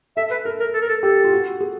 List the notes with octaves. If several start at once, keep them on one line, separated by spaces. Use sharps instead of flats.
A4 E5
B4
A4 A#4
A#4
A4
A#4
A4
G4 A4
F4
F#4
G#4